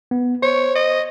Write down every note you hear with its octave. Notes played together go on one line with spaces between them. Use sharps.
B3
C5 C#5
D#5